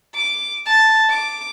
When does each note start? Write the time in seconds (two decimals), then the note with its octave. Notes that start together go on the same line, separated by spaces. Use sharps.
0.15 D6
0.66 A5
1.10 D6